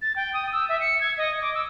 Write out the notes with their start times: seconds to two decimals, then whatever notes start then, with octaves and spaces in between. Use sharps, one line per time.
0.02 A6
0.16 G5
0.33 D#6
0.52 E6
0.69 E5
0.81 C#7
1.01 G#6
1.18 D#5
1.41 D6
1.55 E6